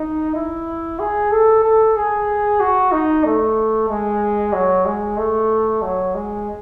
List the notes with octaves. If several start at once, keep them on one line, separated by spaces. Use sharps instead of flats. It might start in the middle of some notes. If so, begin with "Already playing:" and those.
Already playing: D#4
E4
G#4
A4
A4
G#4
F#4
D#4
A3
G#3
F#3
G#3
A3
F#3
G#3